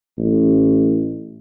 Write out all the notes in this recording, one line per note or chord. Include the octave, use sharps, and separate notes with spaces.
A1